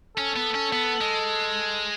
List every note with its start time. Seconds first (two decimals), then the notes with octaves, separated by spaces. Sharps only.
0.17 C#4 A4
0.36 B3
0.55 C#4
0.73 B3
1.01 G#3